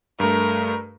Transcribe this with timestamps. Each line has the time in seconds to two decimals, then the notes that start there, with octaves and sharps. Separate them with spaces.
0.20 G2 A3 A#4